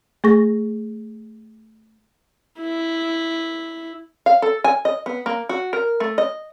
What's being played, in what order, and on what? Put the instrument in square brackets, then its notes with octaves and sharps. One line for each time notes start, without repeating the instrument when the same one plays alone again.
[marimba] A3 G#4 C#6 A#6
[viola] E4
[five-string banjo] F5
A4
G#5
D#5
B3
A#3
F#4
A#4
A3
D#5